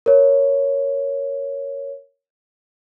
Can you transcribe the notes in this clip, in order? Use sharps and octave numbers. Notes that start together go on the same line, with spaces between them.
A#4 C#5